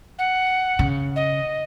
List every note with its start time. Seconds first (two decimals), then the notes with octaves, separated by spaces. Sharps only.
0.18 F#5
0.79 C#3
1.16 D#5